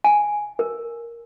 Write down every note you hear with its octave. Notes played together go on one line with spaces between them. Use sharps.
G#5
A#4